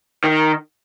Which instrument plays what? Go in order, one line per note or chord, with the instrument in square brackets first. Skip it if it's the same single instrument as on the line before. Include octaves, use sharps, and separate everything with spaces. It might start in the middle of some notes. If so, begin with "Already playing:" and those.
[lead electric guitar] D#3